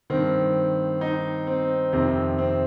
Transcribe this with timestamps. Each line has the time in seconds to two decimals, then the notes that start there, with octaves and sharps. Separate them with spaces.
0.10 G2 D#3 C4
1.01 D#4
1.47 C4
1.93 F2 C3 D#3 C4
2.38 C4